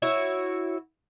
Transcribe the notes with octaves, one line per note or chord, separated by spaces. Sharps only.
E4 F#4 C#5